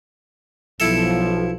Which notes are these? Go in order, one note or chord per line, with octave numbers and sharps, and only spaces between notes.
B1 F3 E4 A4